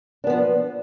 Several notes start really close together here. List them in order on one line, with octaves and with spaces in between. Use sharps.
D4 B3 F3